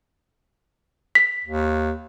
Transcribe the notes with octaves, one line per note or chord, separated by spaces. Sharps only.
B6
D#2